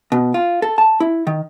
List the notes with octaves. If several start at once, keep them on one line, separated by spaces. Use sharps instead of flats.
B2
F4
A4
A5
E4
D#3